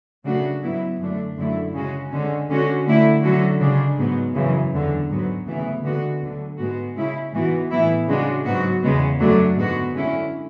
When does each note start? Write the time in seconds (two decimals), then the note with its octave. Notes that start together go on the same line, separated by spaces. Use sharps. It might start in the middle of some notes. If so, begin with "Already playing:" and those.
0.25 C#3 F#3 A3 D4 F#4
0.63 G#2 F#3 B3 E4
0.99 F#2 D3 A3 D4
1.37 F#2 D3 A3 E4
1.73 C#3 G#3 C#4 F#4
2.11 D3 G#3 C#4
2.49 D3 G#3 C#4 F#4
2.86 D3 A3 E4
3.23 D3 F#3 C#4 F#4
3.60 C#3 G#3 D4
3.98 G#2 F#3 B3
4.35 F#2 C#3 E3
4.73 E2 D3 F#3
5.10 G#2 F#3 B3
5.46 D2 C#3 E3 B3 E4
5.84 D3 G#3 B3 F#4
6.21 D2 D3 F#3
6.58 G#2 G#3 B3 F#4
6.96 C#3 G#3 C#4 E4
7.33 G#2 E3 B3 F#4
7.70 A2 E3 B3 E4
8.08 C#3 G#3 D4 F#4
8.45 G#2 F#3 B3 F#4
8.82 E2 C#3 G#3 B3
9.19 F#2 D3 F#3 A3 D4
9.57 G#2 G#3 B3 F#4
9.94 D3 G#3 C#4 E4